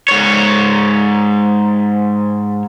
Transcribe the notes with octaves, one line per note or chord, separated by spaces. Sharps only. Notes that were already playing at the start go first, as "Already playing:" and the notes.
G#2 C#5